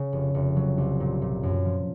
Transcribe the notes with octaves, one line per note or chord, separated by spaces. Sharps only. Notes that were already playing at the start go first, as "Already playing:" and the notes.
Already playing: C#3
F1
F1
F#3
C2
A#2
A#2
F#2
F3